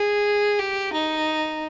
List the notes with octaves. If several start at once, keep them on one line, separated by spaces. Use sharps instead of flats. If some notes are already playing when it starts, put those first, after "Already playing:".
Already playing: G#4
G4
D#4